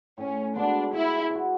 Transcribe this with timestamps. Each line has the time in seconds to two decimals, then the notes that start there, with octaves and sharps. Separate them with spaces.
0.18 A2 C#4
0.55 G#3 B3 D4 F#4
0.93 G#3 E4
1.30 D4 F#4